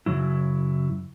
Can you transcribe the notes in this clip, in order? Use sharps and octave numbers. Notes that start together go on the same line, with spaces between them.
F#2 C#3 F#3 E4